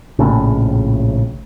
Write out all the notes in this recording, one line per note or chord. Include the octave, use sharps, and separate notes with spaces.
A#1 A2 C#3